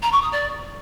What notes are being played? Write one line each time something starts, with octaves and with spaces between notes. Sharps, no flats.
A#5
C#6
D#6
D5